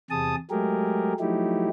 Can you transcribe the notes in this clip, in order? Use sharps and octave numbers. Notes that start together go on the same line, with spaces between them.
E2 C3 G#4 A5 D#6
F#3 G#3 A3 G4 G#4 A#4
F3 F#3 A3 D#4 E4 G4